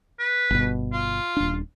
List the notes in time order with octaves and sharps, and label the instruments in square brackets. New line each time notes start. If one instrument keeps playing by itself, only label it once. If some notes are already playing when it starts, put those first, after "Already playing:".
[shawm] B4
[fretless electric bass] G1 B2
[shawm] F4
[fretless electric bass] D#1 D4